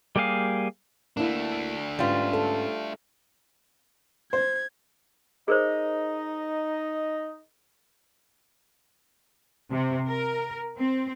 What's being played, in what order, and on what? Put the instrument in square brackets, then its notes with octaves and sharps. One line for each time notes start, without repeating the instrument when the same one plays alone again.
[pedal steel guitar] G3 A#3 G4 G#4 F5
[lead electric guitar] A3 D4 [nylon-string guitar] A#3 E4
[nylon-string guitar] G#2 B3 C#4 [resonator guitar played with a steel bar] G3 F4
[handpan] A4
[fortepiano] C5 [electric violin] G#6
[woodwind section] D#4 D#5 [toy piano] G#4 A#4 C5
[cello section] C3
A#4
C4